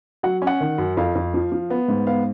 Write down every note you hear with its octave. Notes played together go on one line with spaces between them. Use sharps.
F#3 F#5
C#4
F#5
D#3
F#2
F2 F5
F2
F3
F3
B3
G#2
B3 F5